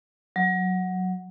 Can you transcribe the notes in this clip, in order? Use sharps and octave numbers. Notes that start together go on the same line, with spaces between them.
F#3